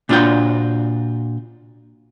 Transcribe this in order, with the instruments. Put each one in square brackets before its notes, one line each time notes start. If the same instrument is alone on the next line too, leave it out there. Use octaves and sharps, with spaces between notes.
[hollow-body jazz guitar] A#2 D4 F4 F#4 G5